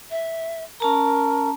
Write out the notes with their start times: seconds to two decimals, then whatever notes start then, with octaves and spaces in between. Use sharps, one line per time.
0.10 E5
0.80 C#4 A#4 A5 A#5